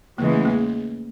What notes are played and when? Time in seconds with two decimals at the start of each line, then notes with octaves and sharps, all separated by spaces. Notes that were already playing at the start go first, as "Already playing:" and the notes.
0.18 E2 C#3 E3 G#3 A#3
0.32 A3
0.45 A#3